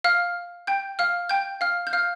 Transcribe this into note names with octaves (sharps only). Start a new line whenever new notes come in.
F5 F6
G5 G6
F5 F6
G5 G6
F5 F6
G6
F5 F6